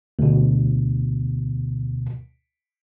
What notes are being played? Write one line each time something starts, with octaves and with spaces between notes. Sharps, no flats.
D2 B2